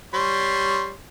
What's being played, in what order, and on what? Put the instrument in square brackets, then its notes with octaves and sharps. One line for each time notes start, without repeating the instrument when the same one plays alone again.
[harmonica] G3 C#5 C6